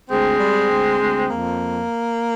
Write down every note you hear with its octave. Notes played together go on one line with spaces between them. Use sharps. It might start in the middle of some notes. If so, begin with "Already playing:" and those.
D2 G#3 C4
G3
D2
D2
F2 A#3